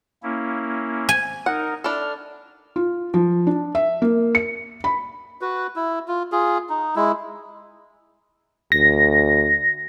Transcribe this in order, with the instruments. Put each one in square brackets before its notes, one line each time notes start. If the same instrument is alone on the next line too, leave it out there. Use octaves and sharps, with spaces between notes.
[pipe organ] A#3 C#4 E4
[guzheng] G#5
[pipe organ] D#4 A#4 [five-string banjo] F#5
[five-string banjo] D4 E4 A4 [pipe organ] F6
[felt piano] F4
F3
D4
E5
A#3
C#7
B5
[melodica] F#4 B4
E4
F4
F4 G#4
D#4
G#3 E4
[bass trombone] D2 [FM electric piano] A#6